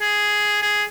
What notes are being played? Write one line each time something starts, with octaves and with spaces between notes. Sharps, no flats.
G#4
G#4